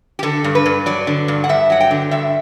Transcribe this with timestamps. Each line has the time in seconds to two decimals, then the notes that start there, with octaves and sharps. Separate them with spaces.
0.19 G4
0.23 D3 A4
0.44 G2
0.55 B4
0.66 G2
0.86 F#3 D5
1.07 D3
1.28 G2
1.44 F#5
1.49 G2 E5
1.70 F#3 F#5
1.80 G5
1.91 D3
2.11 G2 E5